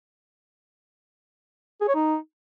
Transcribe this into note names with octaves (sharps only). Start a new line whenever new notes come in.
G#4
C#5
D#4